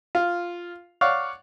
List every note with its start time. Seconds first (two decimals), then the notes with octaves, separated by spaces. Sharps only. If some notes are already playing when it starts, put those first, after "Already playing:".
0.15 F4
1.01 C#5 D5 F5 F#5